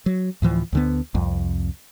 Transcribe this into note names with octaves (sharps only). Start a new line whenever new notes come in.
F#3
D2 A2 E3 F3
D2 D3 B3
C2 F2